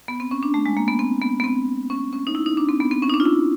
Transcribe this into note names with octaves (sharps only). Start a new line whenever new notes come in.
B3
C4
C#4
D4
A3
G#3
A#3
B3
C4
B3
B3
C4
C#4
C#4
D#4
E4
D#4
D4
C4
B3
C4
C#4
D#4
D4
F4
E4